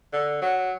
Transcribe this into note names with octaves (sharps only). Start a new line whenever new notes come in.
D3
F#3